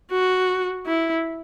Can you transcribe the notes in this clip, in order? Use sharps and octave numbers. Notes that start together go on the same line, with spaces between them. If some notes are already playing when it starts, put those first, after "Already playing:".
F#4
E4